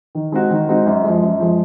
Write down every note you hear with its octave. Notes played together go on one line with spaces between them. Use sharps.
D#3
G#3 C4 D#4 F#4
D#3
G#3 C4 D#4 F#4
F#2
F3 G#3
F#2
F3 G#3